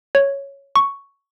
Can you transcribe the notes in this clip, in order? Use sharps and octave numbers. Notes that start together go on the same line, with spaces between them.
C#5
C#6